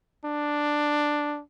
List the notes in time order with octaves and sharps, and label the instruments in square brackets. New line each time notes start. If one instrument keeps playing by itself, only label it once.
[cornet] D4